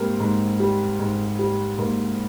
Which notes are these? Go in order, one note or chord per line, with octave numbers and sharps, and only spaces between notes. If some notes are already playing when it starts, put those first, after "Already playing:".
Already playing: G#2 G3 A#3 C4 A#4
G#2
G3
G#2
G3
G#2 A#3 A#4